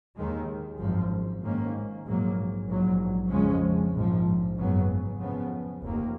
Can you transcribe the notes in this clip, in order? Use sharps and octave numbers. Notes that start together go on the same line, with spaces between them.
D#2 D#3 G#3
G#1 F#2 F3
G#2 D#3 A#3 C#4
A#1 G#2 F#3 A#3
A#1 G#2 F#3
F2 C#3 F3 G#3 C#4
A#1 G#2 F3
G#1 F#2 C#3 F#3 B3
F2 C#3 F3 B3
F1 D#2 D#3 A#3